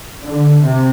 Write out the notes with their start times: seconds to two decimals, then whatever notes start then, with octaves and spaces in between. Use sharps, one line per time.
0.22 D3
0.62 C3